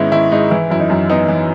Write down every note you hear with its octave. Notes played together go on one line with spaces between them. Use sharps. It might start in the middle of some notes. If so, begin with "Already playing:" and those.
Already playing: G#2 D#3 G#3 B3 C#4 E4
D#3 E4
G#2 D#4
E3 E4
F#2 E4
D#4
F#2
B3 D#4
E3